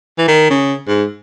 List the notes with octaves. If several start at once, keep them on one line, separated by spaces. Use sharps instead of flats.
E3
D#3
C#3
G#2